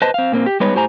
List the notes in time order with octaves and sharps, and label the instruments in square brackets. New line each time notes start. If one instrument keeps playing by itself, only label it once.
[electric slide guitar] B4 C5 D#5 A5
C4 F5
A#2 A#3 C4
G4
G3 G#3 B3 D#4 B4 C#5
A2 G4 C5 G#5 A#5